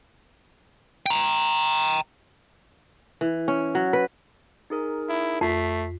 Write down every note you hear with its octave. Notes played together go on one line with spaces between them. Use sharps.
G5 A#5
E3
C#4
F#3
B4
D#4 G#4 A#4
E4
F2 A3 B6 C7